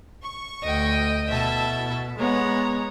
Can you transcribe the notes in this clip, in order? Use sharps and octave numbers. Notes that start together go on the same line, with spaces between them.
C#6
D2 D#5 G5
B2 E4 A4 E5 A5
G#3 B3 C#5 A#5